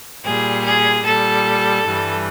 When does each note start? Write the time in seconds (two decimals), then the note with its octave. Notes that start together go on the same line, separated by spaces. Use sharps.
0.24 A#2 G3 G#4
0.64 G#4
1.04 A#2 G3 A4
1.84 G2 E3 G3